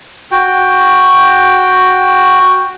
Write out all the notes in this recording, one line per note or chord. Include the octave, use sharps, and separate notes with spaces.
F#4 G5